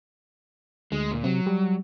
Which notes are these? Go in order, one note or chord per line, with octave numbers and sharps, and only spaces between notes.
D2 G#3
A#2
C3 F#3
G3